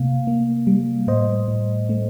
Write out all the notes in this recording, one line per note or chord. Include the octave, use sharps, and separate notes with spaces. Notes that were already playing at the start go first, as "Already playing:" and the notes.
Already playing: C3 A3 A#3 F5
A#3
G3
A2 C5 D#5
A2
A3